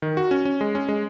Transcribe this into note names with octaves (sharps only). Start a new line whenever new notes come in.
D#3
F#4
C#4
C#4
G#3
C#4
G#3